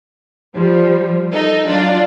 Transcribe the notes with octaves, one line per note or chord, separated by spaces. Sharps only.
F3 G3
D#4 A4
F#3 D4 F4